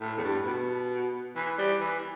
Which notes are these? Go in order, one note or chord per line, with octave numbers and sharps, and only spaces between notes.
A2
E2
G2
B2
E3
G3
E3